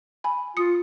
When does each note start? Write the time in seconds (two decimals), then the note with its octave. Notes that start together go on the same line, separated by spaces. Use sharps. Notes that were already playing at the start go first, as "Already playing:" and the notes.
0.24 G#5 B5
0.57 F4 D#6 C#7